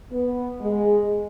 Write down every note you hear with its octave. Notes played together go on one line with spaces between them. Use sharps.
B3
G#3